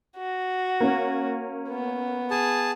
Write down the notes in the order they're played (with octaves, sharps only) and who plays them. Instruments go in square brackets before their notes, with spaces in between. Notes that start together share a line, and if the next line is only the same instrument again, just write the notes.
[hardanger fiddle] F#4
[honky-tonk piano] A#3 C#4
[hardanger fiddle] B3
[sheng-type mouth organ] G#4 A5